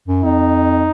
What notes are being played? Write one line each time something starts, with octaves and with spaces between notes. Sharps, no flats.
F#2
F2 D#4